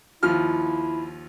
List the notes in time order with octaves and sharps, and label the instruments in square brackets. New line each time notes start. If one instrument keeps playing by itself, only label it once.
[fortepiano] D#2 F3 F6 [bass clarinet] E4